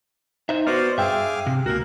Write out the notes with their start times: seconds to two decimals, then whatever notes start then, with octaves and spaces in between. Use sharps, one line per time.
0.49 D#4 C5 E5
0.67 B3 F#4 C5 D5 F6
0.98 G2 G#4 E5 F5 G5 D6 E6
1.47 C3
1.66 C#2 A#3 F#4 A#4